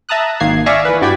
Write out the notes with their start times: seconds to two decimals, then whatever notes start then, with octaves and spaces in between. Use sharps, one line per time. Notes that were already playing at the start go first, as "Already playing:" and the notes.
0.09 E5 A5 A#5 D#6 F#6
0.40 G#1 D#3 A#3 G#6 C7
0.66 D5 E5 F5 G#5 C#6 A#6
0.85 E3 B4
1.01 G2 F#4 D5 G5 G#6 B6